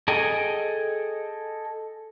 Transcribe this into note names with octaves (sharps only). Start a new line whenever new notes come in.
G#4 A4 D#5 G5 G#5